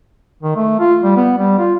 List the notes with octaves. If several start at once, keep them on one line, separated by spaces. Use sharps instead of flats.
D#3
A3
F4
G3
B3
G3
F4